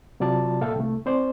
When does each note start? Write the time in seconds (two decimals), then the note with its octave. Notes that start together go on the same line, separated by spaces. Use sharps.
0.20 C3 F#3 F4 D5 A5
0.61 A#2 A4 E5 F5 G5
0.76 C2 A3
1.06 C4 C5 D5